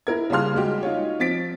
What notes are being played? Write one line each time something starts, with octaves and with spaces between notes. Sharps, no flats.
E4 A#4 G#6
C#3 G3 A#3 F5 C6 F6
G3 G#3 F#4 G4
D#4 F4 C#5
F3 C4 A6 B6 D7